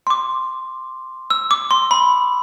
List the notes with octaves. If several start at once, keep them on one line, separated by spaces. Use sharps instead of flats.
C6
D6
E6
D6
C6
B5